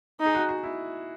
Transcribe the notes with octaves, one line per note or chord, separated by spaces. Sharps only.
D#4
G#4
F#4
F#4
E4